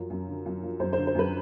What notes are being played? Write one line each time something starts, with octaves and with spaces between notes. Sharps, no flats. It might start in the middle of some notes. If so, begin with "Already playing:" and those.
Already playing: F#2 F3
F#2
D3
F#2
F3
F#2 C5
D3 C5
C5
F#2 B4